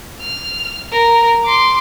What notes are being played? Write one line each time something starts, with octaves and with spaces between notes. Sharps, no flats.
F6
A#4
C6 D6